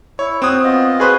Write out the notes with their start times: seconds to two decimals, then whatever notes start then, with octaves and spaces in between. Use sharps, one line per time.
0.19 E4 C#5
0.42 C4 F#4 D#6
0.64 B3 F4 D#5
1.00 F#4 G#4 B4 C5